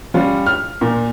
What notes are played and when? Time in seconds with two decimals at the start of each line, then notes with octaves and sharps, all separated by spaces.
0.14 G3 C#4 F4
0.46 F6
0.81 A#2